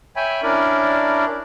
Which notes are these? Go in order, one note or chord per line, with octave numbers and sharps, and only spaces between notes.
C#5 E5 G5 G#5 B5
C#4 D4 E4 A#4 D5